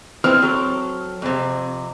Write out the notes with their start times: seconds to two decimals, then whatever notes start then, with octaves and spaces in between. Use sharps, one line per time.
0.24 E3 C4 F6
0.42 F#3 A4
1.22 F2 C3